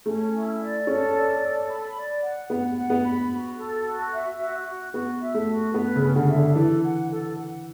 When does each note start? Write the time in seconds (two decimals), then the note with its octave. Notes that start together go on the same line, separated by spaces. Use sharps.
0.05 A3 C#4
0.32 E4
0.60 D5
0.87 C#4 A4
1.14 D5
1.41 A4
1.68 B5
1.95 D5
2.22 F#5
2.49 B3 F#5
2.76 F#5
2.90 B3
3.03 B5
3.30 F#4
3.58 A4
3.85 F#4
4.12 E5
4.39 F#4
4.67 F#4
4.93 B3 F#4
5.20 E5
5.34 A3
5.48 F#4
5.74 B3 B4
5.96 C#3
6.02 C#4
6.16 D3
6.29 E5
6.36 D3
6.55 E3 A4
6.83 F#5
7.10 A4
7.37 F#5